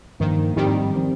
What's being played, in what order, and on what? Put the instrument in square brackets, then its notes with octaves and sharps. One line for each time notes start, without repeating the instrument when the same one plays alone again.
[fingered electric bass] G2 F3 A#3 [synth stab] D#3
[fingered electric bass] G#2 F3 C4 [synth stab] D#3 G3
[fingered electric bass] F3 C4